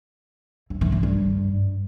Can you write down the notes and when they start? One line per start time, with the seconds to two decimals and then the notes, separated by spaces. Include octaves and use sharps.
0.70 E3
0.81 E3
0.92 E3
1.03 G2